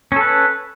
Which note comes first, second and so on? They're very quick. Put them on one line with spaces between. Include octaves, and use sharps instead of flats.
C#4 A4 B4